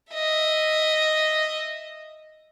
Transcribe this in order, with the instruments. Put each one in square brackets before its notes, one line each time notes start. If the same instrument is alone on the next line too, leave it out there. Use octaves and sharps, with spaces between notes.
[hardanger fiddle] D#5 E5